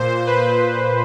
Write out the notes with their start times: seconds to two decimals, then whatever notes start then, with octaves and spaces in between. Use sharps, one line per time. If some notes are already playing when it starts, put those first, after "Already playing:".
Already playing: A#2 C5
0.27 B4